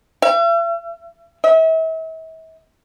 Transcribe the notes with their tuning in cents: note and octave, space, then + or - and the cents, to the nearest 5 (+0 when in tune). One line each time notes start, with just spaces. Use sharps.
E5 +45
E5 -40